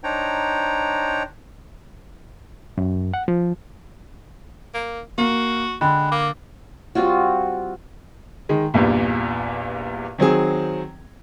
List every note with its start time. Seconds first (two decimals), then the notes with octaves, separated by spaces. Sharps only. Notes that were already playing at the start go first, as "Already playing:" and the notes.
0.04 D4 D#4 C5 C#5 G5 A#5
2.78 F#2
3.14 F#5
3.28 F3
4.74 A#3
5.18 A#3 F#4
5.81 D3 G#3 G5 B5 F#6
6.12 A#3 D6
6.95 G3 C4 F4 F#4
8.49 D#3 G#3
8.74 A#1 E2 G2 A#2
10.18 D#3 F#3 C4 G#4